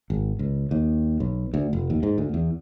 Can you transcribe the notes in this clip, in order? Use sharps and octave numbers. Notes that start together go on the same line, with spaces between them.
G#1
C#2
D#2
B1
D2
F1
D#2
G#2
D2
E2